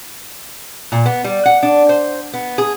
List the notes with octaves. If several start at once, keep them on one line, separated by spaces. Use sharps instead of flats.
A#2
B3
G3
F#5
D4
C5
B3
G#4